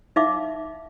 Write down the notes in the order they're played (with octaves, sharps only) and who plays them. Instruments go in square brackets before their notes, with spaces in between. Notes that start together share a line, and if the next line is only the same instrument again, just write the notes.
[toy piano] D#4 E5 F5 D6